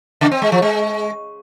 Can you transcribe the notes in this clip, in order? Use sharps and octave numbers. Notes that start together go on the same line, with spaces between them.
C#3
C4
G#3
F3
G#3